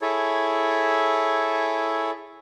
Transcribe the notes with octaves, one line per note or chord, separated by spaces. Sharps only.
E4 G#4 A4 C#5